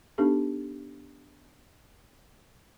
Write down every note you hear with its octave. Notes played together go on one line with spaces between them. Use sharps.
B3 D4 D#4 G4 A4